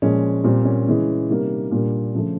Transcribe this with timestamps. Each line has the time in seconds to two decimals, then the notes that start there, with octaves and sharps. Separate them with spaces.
0.02 A#2 F3 G#3 C#4
0.44 A#2 G3 A#3 C4
0.65 C#4
0.86 C#3 E3 G#3
1.30 C3 D#3 G3 A#3
1.71 A#2 G3 A#3 D4
2.15 C#3 F3 A3